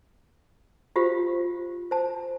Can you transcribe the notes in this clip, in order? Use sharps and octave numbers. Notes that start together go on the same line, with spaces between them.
F4 G4 C5 F5
C5 A5